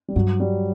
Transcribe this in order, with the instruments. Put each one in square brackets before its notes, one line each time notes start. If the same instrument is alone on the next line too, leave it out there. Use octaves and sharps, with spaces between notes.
[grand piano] G3
[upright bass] G2 [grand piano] F#3
[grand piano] G3